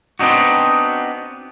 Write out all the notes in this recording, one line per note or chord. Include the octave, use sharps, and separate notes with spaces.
B3 C4 D4 D#4 F#4